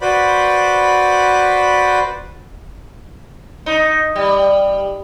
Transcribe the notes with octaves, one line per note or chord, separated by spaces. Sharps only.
F#4 B4 C5 D5 B5
D#4
G3